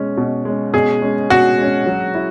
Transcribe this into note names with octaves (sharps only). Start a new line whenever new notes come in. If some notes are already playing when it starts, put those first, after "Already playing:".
Already playing: B2 G#3 C#4
B2
G#3 C#4
B2 G#4
G#3 C#4
B2 F#4
G#3 C#4
F#3
E4